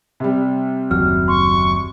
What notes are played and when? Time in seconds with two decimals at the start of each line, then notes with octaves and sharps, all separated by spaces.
0.20 C3 G3
0.91 F#1 D#2 F#3 F6
1.28 C6 C#6